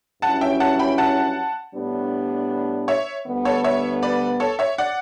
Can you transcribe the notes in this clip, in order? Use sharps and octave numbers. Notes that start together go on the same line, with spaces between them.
G2 F#3 C#4 E4 F#5 A5
E5 G5
F#5 A5
G5 B5
F#5 A5
A2 G3 B3 D4
C#5 E5
D2 D3 G3 B3
A4 C#5
C#5 E5
B4 D5
A4 C#5
C#5 E5
D5 F#5